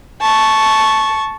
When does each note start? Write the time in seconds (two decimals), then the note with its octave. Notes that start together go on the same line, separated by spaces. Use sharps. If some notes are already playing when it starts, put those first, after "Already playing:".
0.21 A5 C#6